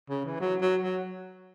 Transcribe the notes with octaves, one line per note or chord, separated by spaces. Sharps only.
C#3
E3
F#3
F#3
F#3